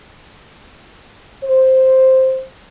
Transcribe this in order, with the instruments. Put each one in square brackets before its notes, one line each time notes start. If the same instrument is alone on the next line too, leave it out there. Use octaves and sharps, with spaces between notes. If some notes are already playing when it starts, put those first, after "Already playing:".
[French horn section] C5